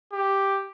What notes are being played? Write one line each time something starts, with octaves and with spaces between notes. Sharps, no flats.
G4